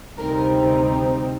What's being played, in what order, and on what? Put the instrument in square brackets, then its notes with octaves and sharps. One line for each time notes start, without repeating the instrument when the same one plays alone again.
[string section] D2 C3 G3 C4 D#4 A#4